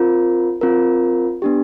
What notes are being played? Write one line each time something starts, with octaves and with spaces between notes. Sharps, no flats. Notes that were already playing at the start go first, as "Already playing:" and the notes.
Already playing: C4 F4 A#4
C4 F4 A#4
B3 D4 G4